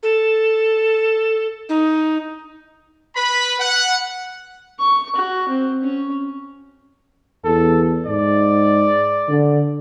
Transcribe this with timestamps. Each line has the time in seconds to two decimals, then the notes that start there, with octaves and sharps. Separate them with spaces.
0.03 A4
1.69 D#4
3.15 B4 B5
3.60 F#5
4.80 C#6
5.15 F#4
5.48 C4
5.83 C#4
7.45 E2 A4
8.06 G#2 D5
9.28 D3